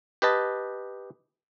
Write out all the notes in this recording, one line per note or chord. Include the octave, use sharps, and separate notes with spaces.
G4 B4 D#5 A5